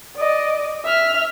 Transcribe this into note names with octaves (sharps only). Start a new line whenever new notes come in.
D5 D#5
E5 F6